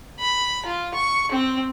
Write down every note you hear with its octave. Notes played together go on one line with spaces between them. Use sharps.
B5
F4
C#6
C4